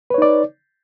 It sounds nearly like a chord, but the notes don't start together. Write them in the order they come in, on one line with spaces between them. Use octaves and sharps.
B4 C#5 D#4 D5